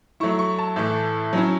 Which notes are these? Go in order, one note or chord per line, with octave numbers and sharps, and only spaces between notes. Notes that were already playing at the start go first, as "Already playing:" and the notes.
F#3 A3 E4 C#6
C#6
A5
A2 E3 A3
F#3 C#4 E4